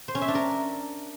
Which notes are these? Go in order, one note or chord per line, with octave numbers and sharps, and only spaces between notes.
C5
C#4
E5
D4
A#4